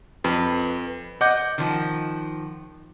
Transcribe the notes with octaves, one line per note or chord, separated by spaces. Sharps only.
F2 B4
D#5 F#5 D6 G6
D#3 F3